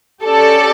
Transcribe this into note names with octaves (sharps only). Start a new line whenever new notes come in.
C#4 G4 A4 D5